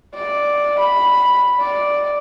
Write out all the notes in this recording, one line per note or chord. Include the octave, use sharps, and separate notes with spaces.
D5
B5
D5